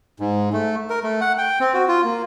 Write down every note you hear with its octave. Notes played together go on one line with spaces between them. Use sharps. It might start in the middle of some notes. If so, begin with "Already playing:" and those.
G#2
A3
A#4
A3
F#5
G5
C4
F#4
F4
A#3